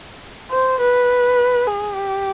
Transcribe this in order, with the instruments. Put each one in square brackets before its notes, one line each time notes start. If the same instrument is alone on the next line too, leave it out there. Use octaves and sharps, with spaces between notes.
[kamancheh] C5
B4
G#4
G4